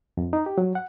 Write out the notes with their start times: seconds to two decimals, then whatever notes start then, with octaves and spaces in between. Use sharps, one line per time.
0.17 F2
0.33 D#4
0.46 G4
0.58 F#3
0.75 F#5